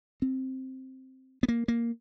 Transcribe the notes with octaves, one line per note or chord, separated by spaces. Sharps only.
C4
B3
A#3
A#3